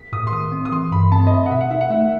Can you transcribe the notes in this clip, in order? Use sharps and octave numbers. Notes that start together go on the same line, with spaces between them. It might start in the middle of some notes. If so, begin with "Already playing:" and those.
Already playing: B6
A2 D#6
C6
D#3 D#6
C4
D#6
E3 C6
G2 B5
C4 A5
D#5
C4 E5
F#5
B2 E5
F#5
D#4 E5
F#5
A3 E5